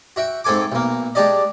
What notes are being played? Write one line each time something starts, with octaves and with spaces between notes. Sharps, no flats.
F#4 E5 G5
G#2 C4 A4 G#5 D6
B1 A#3
G#3 D4 G4 D5 D#5